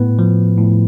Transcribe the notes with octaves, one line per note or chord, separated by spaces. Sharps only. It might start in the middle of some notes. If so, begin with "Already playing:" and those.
Already playing: A2 B3 B4
F3
A2